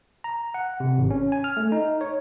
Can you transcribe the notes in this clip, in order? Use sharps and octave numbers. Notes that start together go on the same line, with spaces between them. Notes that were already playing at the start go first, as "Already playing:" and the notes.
A#5
F#5
C3
G#1
C#4
G#5
F6
A3
D#4
C#5